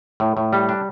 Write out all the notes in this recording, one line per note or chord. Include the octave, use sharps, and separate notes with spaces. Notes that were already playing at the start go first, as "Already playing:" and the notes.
A2
A2
G3
D4